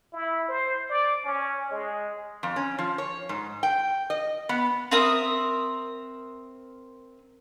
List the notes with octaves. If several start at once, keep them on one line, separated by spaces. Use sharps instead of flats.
E4
C5
D5
C#4
G#3
F2
C#4
F3
C#5
G#2
G5
D#5
B3
C4 A#4 E5 D#6